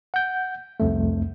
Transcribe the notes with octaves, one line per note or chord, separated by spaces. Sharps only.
F#5 G6
C2 F2 A3